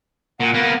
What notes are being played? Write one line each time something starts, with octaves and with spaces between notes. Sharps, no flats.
A#2 F#5
A#3 B3